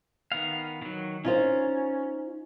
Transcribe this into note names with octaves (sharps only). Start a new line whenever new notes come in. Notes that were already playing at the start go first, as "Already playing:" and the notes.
D#3 B3 F5
D#3 F#3
C#4 D#4 F4 C5